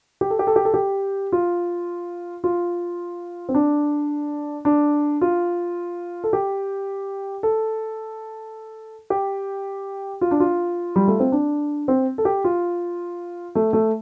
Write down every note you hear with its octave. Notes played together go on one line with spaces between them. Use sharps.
G4
A4
G4
A4
G4
A4
G4
F4
F4
C4
D4
D4
F4
A4
G4
A4
G4
F4
D4
F4
G3
A3
C4
D4
C4
A4
G4
F4
A3
A3